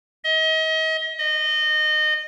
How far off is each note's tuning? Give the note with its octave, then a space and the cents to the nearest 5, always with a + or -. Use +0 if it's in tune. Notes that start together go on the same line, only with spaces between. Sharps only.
D#5 +35
D#5 -25